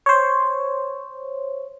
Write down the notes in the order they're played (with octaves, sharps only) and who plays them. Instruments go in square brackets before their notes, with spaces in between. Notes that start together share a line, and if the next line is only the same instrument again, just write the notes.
[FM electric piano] C5 C#5